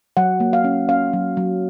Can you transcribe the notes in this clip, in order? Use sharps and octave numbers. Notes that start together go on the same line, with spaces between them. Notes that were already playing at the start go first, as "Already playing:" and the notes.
F#3 F#5
A#3
F5
C#4
C#4 F5
F#3
F#3